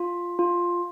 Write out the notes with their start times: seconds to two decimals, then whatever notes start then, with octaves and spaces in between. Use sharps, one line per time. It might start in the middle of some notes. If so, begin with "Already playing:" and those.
Already playing: F4
0.39 F4